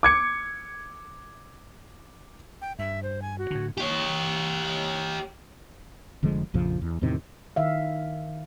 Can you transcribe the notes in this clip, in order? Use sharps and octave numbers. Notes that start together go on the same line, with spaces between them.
D6 G#6 C#7
G5
G2 E5
C5
G#5
F#4
A2 D3
G4 C#5
F1 D3 F3 G#3
A#1 F2 C#3 F3
E2
E2 A2 C3 D#3
D#3 E5 F5